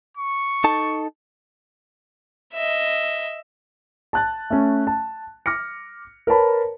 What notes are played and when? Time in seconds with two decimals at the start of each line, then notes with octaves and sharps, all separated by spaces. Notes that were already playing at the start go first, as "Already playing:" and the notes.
0.17 C#6
0.64 D#4 A4 A5
2.53 D#5 E5
4.13 A5 F#6 A6
4.50 A3 C#4
4.87 A5
5.46 D6 F6 A#6 C#7
6.27 A#4 B4 C#5 A5 B5